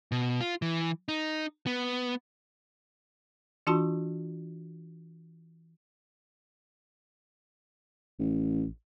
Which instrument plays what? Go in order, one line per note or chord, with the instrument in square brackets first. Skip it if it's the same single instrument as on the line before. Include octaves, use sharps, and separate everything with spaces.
[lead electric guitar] B2
F4
E3
D#4
B3
[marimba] E3 D4 F4 F#4 A5 C6
[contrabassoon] A1